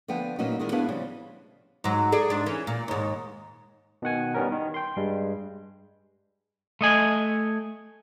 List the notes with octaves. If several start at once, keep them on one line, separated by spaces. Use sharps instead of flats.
D3 F3 B3 G5
A#2 F#3 A#3 B3 C#4 D#4
D#3 G3 G#3 E4 A#4
B3 D4 E4 G#4 B4 F5
C#3 F3 G3
G#2 F#3
G#4 A4 D5
G#2 D4
E3 C#4
A#2
D#2 G#2
B2 D#3 F#5 G#5
D#3 G3 B3 C#4 A#4
D#3
G5 C6
G2 G3 G#3
A3 D#5 G#5